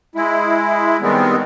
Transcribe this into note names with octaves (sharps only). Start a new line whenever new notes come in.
G#3 E4
D#3 G3 G#3 B3 C4